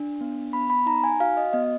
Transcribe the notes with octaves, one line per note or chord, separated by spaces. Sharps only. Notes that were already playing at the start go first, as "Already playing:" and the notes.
Already playing: D4
B3
B3 B5
B5
D#4 A#5
G#5
F#4 F5
D#5
B3 D#5